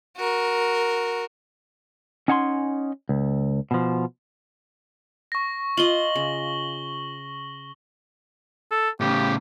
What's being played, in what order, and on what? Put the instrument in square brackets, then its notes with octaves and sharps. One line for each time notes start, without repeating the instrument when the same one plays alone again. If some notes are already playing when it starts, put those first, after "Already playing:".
[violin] F#4 A#4
[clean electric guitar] C#4 D#4 F#5 G#5 A5 C6
C#2
B2 F3
[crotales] C#6 A#6
[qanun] F4 D#5 [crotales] F#7 G7
[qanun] C#3
[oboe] A4
[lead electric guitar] A2 C#3 [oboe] G4